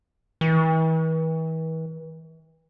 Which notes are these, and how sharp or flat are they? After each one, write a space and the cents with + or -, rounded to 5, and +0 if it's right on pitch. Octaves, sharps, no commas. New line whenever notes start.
E3 -40